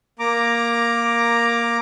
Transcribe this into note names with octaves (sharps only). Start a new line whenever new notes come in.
A#3 A#5 D6